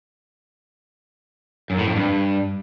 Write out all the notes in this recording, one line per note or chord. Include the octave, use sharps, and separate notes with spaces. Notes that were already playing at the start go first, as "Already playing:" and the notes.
F#2
A2
F2
G2